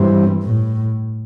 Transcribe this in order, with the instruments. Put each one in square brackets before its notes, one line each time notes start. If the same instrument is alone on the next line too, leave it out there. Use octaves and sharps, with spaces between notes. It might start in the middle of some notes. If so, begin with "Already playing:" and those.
Already playing: [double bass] G2 [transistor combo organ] E3 G3 C4
[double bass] A2